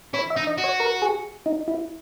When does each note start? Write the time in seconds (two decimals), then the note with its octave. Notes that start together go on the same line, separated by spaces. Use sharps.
0.14 E4 C#5
0.30 E5
0.37 D#4
0.47 D#5
0.58 F#4
0.64 C#5
0.80 A#4
1.02 G#4
1.46 D#4
1.68 E4